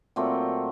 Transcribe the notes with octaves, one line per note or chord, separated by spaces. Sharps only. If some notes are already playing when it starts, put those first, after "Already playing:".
A#2 F#3 A3 C4